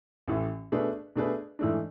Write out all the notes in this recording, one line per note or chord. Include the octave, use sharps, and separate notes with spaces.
A1 A2 E3
B2 A3 D4 G#4 B4
B2 A3 D4 G#4 B4
G#2 E3 A3 D4